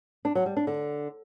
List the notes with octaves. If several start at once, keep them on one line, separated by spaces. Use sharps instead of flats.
D4
F#3
G3
D4
D3